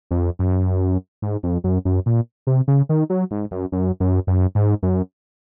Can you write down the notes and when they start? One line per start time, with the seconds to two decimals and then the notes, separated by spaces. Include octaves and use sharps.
0.11 F2
0.39 F#2
1.22 G#2
1.43 F2
1.64 F#2
1.85 F#2
2.06 A#2
2.47 C3
2.68 C#3
2.89 D#3
3.10 F#3
3.31 G#2
3.51 F#2
3.72 F#2
4.00 F#2
4.27 F#2
4.55 G#2
4.83 F#2